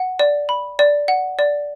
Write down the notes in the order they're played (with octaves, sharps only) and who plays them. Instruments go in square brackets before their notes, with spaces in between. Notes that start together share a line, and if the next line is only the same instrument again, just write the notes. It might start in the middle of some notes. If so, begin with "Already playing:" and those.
Already playing: [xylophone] F#5
D5
B5
D5
F#5
D5